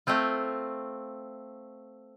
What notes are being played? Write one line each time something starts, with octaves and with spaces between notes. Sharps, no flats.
A3 C4 F4